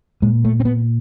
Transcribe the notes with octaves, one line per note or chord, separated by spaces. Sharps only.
A#2 G#3
A3
C4
B3